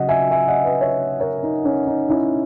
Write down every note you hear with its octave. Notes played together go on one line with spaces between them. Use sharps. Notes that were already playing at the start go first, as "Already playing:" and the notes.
Already playing: C#3 F#3 D#5 F#5
E5 G#5
E5 G#5
D#5 F#5
B4 D#5
C#5 E5
A#4 C#5
D#4
C#4
D#4
C#4 E4